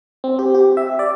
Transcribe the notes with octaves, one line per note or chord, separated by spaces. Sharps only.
C4
G4
G4
E5
D5